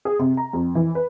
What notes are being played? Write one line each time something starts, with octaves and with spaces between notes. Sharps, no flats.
G#4
C3
A#5
F2
E3
B4